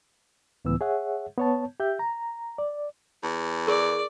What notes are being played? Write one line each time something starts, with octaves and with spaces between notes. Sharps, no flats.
C#2 A2 E3 B3 E6
G#4 C#5 E5 F#5
B3 C#5 A5
G4 E5 G6
A#5
D5
E2
G#4 A#4 D5 C#6